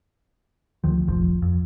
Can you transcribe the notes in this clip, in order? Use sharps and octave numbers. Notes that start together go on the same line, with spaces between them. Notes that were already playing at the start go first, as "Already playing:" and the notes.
D2 D#3 F3
F1 A#1 F3
F2